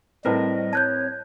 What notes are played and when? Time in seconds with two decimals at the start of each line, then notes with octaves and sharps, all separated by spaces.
0.25 A2 G3 C4 A#4 B4 D#5
0.73 C#5 A5 F#6 G6